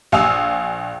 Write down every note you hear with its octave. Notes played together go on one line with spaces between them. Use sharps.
A#1 F5 G#5 D#6 E6 F7